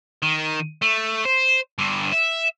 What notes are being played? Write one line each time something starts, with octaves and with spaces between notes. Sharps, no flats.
D#3
A3
C5
G2 D3
E5